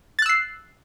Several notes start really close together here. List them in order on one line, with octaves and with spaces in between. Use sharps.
A6 F#6 E6 C7